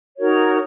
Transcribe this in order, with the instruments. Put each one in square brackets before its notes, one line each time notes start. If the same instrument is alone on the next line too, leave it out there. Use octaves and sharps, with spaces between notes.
[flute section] D#4 F#4 A#4 C#5